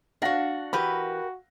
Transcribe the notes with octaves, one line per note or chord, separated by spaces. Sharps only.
D4 F#4 F5 F#5 A#6
E3 F#4 G4 A#4 B4 B5